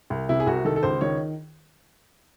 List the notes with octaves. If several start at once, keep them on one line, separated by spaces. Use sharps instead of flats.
C2
C3 E4
G#4
C2 F#4
D#3 A4
A4
C#2 C5
D#3 C#5